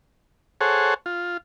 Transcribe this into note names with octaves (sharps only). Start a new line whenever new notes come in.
G#4 A4 C5 C#5 F#5
F4